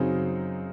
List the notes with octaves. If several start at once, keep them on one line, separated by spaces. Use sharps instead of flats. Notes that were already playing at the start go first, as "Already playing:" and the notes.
Already playing: F#2 C#3 F#3 C4 D#4